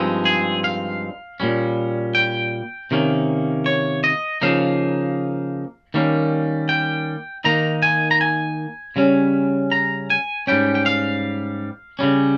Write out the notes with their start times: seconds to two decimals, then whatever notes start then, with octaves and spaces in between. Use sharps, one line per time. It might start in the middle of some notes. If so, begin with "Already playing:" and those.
Already playing: G2 F3 G#3 C4 D#4
0.25 G#4
0.64 F5
1.40 A#2 G3 C#4
2.15 G5
2.91 C3 D#3 A#3 C#4
3.66 C#5
4.04 D#5
4.42 C#3 F3 A#3 D#4 F5
5.94 D#3 G3 A#3 C#4
6.69 G5
7.44 D#3 A#3 D#4 A#5
7.82 G#5
8.11 A#5
8.21 G#5
8.96 C#3 G3 C#4
9.72 A#5
10.10 G#5
10.47 G#2 G3 C#4 G5
10.75 G5
10.86 F5
11.99 C#3 G3 C#4